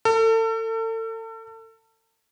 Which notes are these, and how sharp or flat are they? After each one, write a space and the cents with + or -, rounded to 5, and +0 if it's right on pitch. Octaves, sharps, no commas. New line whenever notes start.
A4 +35